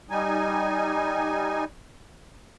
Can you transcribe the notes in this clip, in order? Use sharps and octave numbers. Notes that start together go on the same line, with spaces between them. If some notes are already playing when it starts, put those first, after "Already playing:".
G3 D#4 G#5